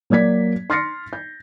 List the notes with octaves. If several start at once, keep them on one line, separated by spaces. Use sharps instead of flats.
F#3 A#3 D5 G#6 B6
C6 F6 A6 A#6 C7 C#7
G6